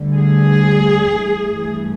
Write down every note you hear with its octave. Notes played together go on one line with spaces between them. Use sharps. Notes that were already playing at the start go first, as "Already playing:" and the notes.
Already playing: D2 D3 G3
G#4
G2 E3 A3